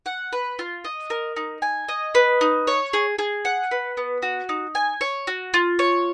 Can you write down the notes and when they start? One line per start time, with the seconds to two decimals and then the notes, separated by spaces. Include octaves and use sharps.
0.06 F#5
0.33 B4
0.59 F4
0.84 D#5
1.10 A#4
1.36 D#4
1.62 G#5
1.88 D#5
2.15 B4
2.41 D#4
2.67 C#5
2.93 G#4
3.19 G#4
3.45 F#5
3.71 B4
3.97 B3
4.22 F#4
4.49 D#4
4.75 G#5
5.01 C#5
5.27 F#4
5.54 F4
5.79 C#5